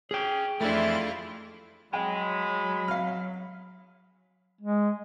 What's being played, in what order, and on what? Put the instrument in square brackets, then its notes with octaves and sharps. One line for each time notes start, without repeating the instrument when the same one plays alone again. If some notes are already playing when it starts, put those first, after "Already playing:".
[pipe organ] C#4 [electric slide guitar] G#4 G5
[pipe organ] F2 E3 A6 [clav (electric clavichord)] A3 D4 [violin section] E4 F4
[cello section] F#3 [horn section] G#3 [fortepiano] G5 [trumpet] B5
[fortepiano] F5 F6
[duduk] G#3